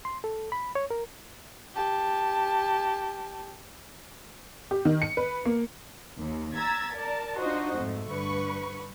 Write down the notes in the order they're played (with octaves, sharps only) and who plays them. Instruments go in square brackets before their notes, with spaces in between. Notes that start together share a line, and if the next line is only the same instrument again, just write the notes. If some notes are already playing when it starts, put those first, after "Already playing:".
[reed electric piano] C6
A4
B5
C#5
A#4
[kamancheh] G4 A5
[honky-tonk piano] G4
D#3
C#7
B4
A#3
[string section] D#2
A#5 E6 G#6 A6 B6
A#4 D5 A5
D4 D#4 F4 F#4 C5 D#5
F2 G#2 A3
G2 D3 B4 C#6